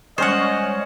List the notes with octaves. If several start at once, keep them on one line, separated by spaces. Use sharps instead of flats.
G3 G#3 C#4 C5 C#5 D#5 F#5